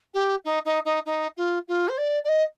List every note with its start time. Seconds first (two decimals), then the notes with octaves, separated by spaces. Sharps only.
0.14 G4
0.44 D#4
0.65 D#4
0.85 D#4
1.06 D#4
1.37 F4
1.68 F4
1.88 C5
1.98 D5
2.24 D5
2.28 D#5